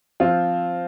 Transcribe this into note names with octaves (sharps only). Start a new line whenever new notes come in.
F3 C4 F4